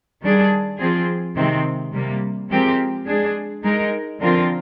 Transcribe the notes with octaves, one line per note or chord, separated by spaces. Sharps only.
D#3 G3 D4 G#4
F3 C4 F4 G#4
C3 D#3 G#3 C4
C3 G3 A#3
F3 G#3 C4 G4 A#4
G#3 D4 G#4
G#3 D#4 A#4
D3 F3 C4 F4 A#4